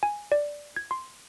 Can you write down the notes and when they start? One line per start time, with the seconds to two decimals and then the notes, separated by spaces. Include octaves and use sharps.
0.03 G#5
0.32 D5
0.76 G#6
0.91 C6